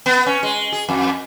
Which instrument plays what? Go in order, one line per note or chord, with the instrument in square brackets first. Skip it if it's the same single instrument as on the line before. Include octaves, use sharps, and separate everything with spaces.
[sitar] B3
C#4
G#3
G#4
F2